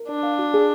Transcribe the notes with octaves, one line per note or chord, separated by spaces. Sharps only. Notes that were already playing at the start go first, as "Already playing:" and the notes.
Already playing: A#4
D4 D5
F5
F#4
G#4